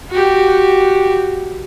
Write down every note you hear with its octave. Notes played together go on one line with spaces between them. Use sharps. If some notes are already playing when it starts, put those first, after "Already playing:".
F#4 G4